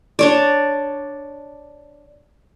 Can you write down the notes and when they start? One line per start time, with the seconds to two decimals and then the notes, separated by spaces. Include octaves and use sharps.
0.19 D4 C#5 D5